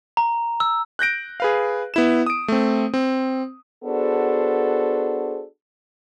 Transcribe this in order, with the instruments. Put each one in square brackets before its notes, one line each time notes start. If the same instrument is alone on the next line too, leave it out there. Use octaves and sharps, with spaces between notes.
[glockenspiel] A#5
E6
[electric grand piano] F#6 G6 A#6 D7
G#4 B4 F5
B3 E4 E7
D#6 D7
A3 C4
C4
[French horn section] B3 D4 F#4 G#4 A4 C5